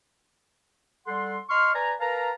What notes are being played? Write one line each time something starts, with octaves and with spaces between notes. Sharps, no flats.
G3 A4 F#5 C6
D#5 C6 C#6 F6
B4 D5 G#5 A#5
A#4 B4 F5 A5 A#5